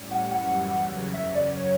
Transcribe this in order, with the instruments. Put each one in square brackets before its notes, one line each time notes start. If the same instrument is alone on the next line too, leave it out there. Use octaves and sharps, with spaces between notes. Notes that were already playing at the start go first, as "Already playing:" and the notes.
Already playing: [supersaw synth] A2 G3 C#4
[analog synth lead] F#5
[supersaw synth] F#2 E3 G3 [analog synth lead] F#5
[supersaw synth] E2 C#3 F#3 C#4
[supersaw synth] F#2 C#3 F#3 C#4 [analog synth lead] E5
[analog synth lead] D5
C#5